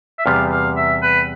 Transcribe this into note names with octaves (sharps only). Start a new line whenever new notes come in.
E5
E2 C3 G3 B3 F5
F5
E5
B4